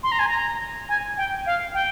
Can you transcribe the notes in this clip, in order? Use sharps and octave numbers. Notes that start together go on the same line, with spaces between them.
C6
A#5
G#5
A#5
G#5
G5
F5
G5